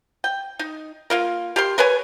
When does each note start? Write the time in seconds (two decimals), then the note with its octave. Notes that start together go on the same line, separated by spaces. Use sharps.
0.24 G5
0.59 D#4
1.10 A#3 F4 A#4
1.56 G4 A#4 C6
1.78 A#4 B4 C#5 G#5